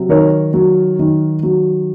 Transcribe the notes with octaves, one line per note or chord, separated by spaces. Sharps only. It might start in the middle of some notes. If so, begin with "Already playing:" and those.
Already playing: C3 F#3
D#3 A#4 C#5
F#3
D#3
F#3